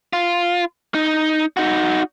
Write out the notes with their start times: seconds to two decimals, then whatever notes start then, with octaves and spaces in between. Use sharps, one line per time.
0.13 F4
0.95 D#4
1.57 D#4 F#4